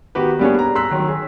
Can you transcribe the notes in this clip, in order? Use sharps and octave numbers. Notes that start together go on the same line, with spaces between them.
D#3 B3 F#4 G4 B4
G3 A#3 B3 D4 G#4 C#5
A#5
A#5 C6 E6 F#6 B6
D#3 F#3
G#4